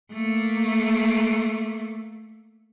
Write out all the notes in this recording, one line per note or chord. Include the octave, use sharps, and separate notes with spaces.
A3 A#3